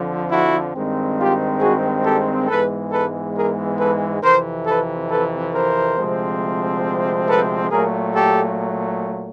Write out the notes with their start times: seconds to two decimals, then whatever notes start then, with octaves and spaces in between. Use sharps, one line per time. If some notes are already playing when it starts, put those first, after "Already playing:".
Already playing: F2 D3 F3
0.30 E4 F#4
0.74 G2 D#3 G#3 C4
1.18 F4 G4
1.61 F#4 G#4
2.05 G4 A4
2.48 G#2 E3 G#3 B3 A4 B4
2.92 A4 B4
3.36 G#4 A#4
3.79 A4 B4
4.22 F2 C3 E3 A#4 C5
4.66 A4 B4
5.10 A4 B4
5.53 A#4 C5
5.97 D2 C3 F3 G#3 C4
7.28 A4 B4
7.71 A#2 F#3 A3 G#4 A#4
8.15 G4 A4